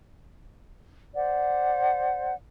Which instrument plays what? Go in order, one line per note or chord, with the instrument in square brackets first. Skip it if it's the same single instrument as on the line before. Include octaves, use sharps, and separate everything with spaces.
[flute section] C5 D5 F#5